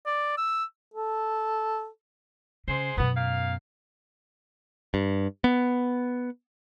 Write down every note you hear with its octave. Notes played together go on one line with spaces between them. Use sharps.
D5
E6
A4
C#3 G#3 C5
F#2 B2 B3
A#2 F5
G2
B3